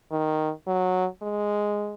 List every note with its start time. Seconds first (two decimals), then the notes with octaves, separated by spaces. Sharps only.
0.12 D#3
0.67 F#3
1.22 G#3